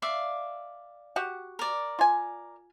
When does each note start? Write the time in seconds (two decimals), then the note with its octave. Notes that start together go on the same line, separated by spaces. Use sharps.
0.02 D5 E5 F5
1.16 F#4 G4 F#5
1.59 A#4 D5
1.99 F4 G#5